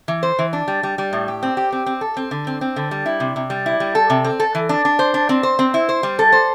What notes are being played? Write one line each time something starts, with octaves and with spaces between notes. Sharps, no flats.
E3
C5
E3
D4
G3
G3
G3
A2
G4
C4
G4
C4
C4
A4
C4
D3
C4
C4
D3
G3
E4
C3
C3
G3
E4
G3
A4
C3
C4
A4
E3
D4
D4
C5
D4
C4
C5
C4
E4
C5
G3
A4
C5